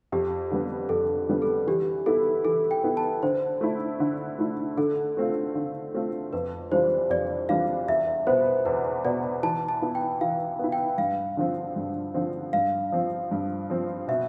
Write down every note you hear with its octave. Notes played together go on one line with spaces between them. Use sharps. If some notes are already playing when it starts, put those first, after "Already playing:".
F2 G4
D3 G3 B3
F2 A4
D3 G3 B3
A4
E3 G4
B3 E4 A4
E3 A4
G5
B3 E4
A5
D3 C5
A3 E4
D3
A3 E4
D3 A4
A3 C4 F4
D3
A3 C4 F4
F2 B4
E3 G3 D4 F4 C5
F2 D5
E3 G3 D4 F4 F5
E2 E5
B2 B3 C5
E2 B4
B2 B3 D5
E3 A5
A5
B3 E4
G5
E3 F5
B3 E4
G5
G2 F5
D3 F3 C4
G2
D3 F3 C4
G2 F5
F3 C4
G2
F3 C4
B2 E5